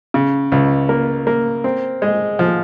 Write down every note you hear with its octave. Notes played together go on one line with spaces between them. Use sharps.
C#3
C#2
A#3
A#3
C4
G#3
F3